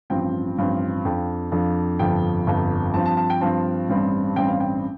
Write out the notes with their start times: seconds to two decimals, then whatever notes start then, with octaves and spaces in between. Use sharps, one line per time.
0.10 A1 G2 F3 C4 G5
0.57 A1 G2 F3 C4
1.05 F2 F3 D4 G5
1.52 F2 F3 D4
1.99 G1 F2 F3 G5
2.47 G1 F2 F3
2.93 G2 F3 C4 A5
3.06 A5
3.17 A5
3.30 G5
3.41 G2 F3 C4 A5
3.89 A1 G2 G3 C4
4.36 A1 G2 G3 C4 G5
4.48 F5
4.60 G5